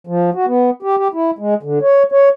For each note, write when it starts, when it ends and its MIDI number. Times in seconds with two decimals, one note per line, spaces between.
0.07 0.30 53
0.35 0.46 66
0.47 0.70 59
0.83 0.96 67
0.97 1.08 67
1.14 1.31 64
1.39 1.54 56
1.63 1.79 50
1.82 2.03 73
2.12 2.29 73